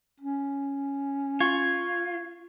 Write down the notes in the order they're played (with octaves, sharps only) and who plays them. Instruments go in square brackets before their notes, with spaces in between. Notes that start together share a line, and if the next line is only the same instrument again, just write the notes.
[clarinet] C#4
[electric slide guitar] F4 [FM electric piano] C#6 G#6